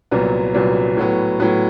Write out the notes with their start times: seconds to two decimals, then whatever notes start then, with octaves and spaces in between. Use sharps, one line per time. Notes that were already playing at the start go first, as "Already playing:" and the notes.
0.11 C2 A#2 F#3 B3
0.54 C2 A#2 F#3 B3
0.97 A2 F#3 B3
1.40 A2 F#3 B3